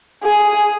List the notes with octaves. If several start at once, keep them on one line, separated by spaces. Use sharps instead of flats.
G#4